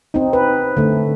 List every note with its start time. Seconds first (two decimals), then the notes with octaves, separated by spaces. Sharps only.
0.14 C4 D#4
0.33 B4
0.77 D3 A3